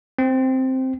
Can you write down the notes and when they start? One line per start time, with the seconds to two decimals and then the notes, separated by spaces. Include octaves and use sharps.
0.19 C4